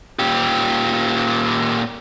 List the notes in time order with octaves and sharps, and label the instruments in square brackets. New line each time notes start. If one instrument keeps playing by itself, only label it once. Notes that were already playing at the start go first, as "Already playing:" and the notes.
[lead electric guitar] A#2 G4